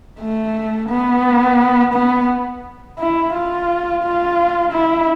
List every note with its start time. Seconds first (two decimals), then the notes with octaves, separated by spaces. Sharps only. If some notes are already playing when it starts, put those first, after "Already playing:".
0.20 A3
0.90 B3
1.94 B3
2.99 E4
3.33 F4
4.03 F4
4.72 E4